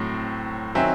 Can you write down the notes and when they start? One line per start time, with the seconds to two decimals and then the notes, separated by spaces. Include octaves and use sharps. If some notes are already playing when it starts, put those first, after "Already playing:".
Already playing: A2 F#3 C4
0.75 D#3 F#3 C4 E5 G#5